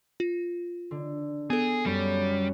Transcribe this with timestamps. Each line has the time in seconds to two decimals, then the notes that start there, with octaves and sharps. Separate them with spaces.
0.20 F4
0.91 D3
1.50 B3 G#4 A4
1.86 F#2 G3